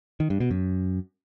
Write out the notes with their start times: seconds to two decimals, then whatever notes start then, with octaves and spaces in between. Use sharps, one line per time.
0.20 D#3
0.30 G2
0.40 B2
0.51 F#2